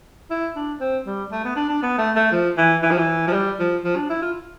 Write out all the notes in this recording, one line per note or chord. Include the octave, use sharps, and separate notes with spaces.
E4
D4
C4
G3
A3
B3
D4
D4
B3
A3
A3
F3
E3
E3
F3
E3
F3
G3
F3
F3
D4
E4
F4